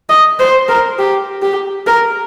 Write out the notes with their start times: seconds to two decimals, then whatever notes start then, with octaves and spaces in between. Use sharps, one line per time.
0.09 D#5
0.39 C5
0.68 A#4
0.99 G4
1.42 G4
1.86 A#4